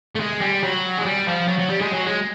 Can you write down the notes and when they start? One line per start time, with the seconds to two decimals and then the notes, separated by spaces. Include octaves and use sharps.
0.15 A3
0.20 G#3
0.42 G3
0.63 F#3
0.98 G#3
1.06 G3
1.27 F3
1.48 F#3
1.59 F#3
1.70 G3
1.81 G#3
1.92 F#3
2.06 G#3